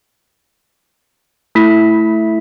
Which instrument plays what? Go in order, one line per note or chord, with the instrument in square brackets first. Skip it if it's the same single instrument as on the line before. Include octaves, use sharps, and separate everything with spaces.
[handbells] A3 E4 B6